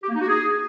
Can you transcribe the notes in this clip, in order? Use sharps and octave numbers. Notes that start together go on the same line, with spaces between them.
G4
A#3
D#4
F#4
G#4